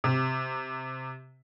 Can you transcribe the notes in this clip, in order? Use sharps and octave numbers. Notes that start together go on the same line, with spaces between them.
C3